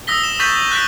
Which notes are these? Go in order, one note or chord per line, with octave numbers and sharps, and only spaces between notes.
D#6 E6 A#6 B6 G7
E7
C#6 G6 A6 B6 F#7
F#6 A6 B6 D7